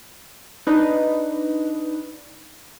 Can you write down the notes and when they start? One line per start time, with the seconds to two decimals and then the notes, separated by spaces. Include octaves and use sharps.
0.67 D4 D#4 B4